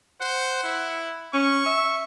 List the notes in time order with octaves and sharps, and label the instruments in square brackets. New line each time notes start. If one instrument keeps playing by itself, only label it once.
[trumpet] C5 [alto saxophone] F#5
[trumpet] E4
[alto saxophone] C#4 [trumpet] C#6
[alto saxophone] E5